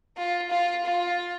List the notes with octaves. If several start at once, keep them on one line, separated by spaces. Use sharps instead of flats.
F4
F4
F4